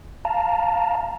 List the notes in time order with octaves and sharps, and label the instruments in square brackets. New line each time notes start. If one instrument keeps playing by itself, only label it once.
[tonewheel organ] F5 A5 A#5